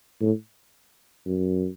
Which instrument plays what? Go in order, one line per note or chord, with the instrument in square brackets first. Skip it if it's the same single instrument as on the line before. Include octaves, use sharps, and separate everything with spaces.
[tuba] A2
F#2